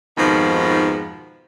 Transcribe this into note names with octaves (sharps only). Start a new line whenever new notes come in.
F2 G#2 B2 D#3 F3